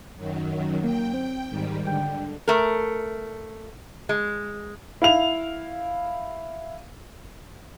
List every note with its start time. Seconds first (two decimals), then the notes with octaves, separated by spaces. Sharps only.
0.16 F#2 D#3 F#3
0.84 A#3 G5
1.14 C4
1.49 G#2 D#3 G3
1.87 D3 G5
2.48 A3 A#4
4.09 G#3
5.02 E4 F5 F7